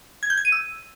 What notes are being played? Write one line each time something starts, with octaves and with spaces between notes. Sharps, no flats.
G#6
G6
G#6
D#7
E6